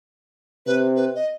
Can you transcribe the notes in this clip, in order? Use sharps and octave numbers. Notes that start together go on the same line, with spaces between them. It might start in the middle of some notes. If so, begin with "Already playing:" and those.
C3 B4
B4
D#5